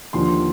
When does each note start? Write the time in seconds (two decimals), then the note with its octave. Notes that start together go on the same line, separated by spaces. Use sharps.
0.13 D#2 D3 F3 C6